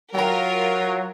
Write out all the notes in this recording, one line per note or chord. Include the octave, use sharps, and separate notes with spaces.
F#3 F4 A#4 G5 A#5